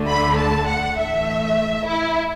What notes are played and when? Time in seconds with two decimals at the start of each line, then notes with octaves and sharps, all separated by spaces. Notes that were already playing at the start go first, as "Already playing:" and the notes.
Already playing: D2 D3 A3
0.09 B5
0.38 A5
0.68 F#5
0.97 A2 E3 A3 E5
1.87 E4